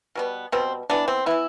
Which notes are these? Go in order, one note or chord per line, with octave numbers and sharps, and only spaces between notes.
B2 G3 B3
B2 G3 B3 C4
E3 B3 D4
C4
E3 B3 E4